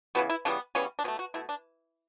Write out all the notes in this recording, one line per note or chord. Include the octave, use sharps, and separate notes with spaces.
C#3 E3 G3 B3 F#4
E4
C#3 E3 G3 B3 D4
C#3 E3 G3 B3 C#4
D4
B2 A3 C#4
F#4
B2 A3 E4
D4